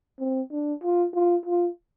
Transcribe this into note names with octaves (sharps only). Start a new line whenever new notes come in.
C4
D4
F4
F4
F4